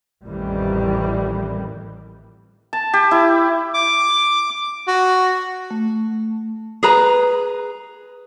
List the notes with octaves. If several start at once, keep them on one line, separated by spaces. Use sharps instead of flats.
A1 F2 D#3 E3 G3
A5
G4
E4
D6
F#4
A3
G#4 B4 A#5